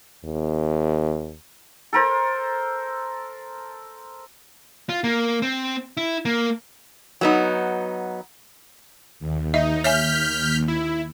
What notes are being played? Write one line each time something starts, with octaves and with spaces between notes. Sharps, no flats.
D#2
A4 A#4 C5
F4
A#3
C4
E4
A#3
F#3 B3 D#4
D#2
D#4 D#5 E5
C#5 E5 G#5 F6 G6 B6
E4